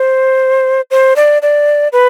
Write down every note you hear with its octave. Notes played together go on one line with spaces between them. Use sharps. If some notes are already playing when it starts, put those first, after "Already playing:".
Already playing: C5
C5
D5
D5
B4